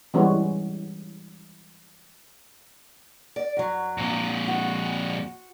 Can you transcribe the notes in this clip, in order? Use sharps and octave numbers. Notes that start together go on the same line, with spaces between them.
E3 G3 G#3 B3 C#4 F#4
D5
F#2 F#3
F2 A#2
F#4